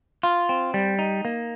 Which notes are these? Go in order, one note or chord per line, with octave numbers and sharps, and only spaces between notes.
F4
C4
G3
D#4
A#3